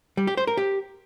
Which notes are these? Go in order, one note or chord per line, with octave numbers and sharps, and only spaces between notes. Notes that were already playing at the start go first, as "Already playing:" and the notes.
G3
G4
C5
A#4
G4